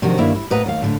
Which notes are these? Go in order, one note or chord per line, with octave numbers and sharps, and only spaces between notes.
C3 D#3 F3 D4 F#4
G2 D#3 A#3 E4 E5
E4
A2 A#3 B4 D#5 F#5 A#5
D#2 F5
A2 D3